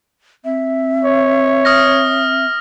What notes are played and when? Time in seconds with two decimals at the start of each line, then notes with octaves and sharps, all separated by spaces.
0.45 C4 E5
1.05 C#5
1.65 D#6 F6 A#6